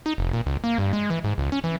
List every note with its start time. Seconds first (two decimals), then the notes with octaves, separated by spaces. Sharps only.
0.06 D#4
0.18 F1
0.33 A#2
0.46 C#2
0.64 A#3
0.78 G2
0.93 G#3
1.10 E3
1.24 G#2
1.38 C#2
1.52 C#4
1.64 E3